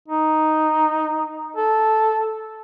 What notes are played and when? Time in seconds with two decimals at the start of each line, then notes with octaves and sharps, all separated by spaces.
0.08 D#4
1.56 A4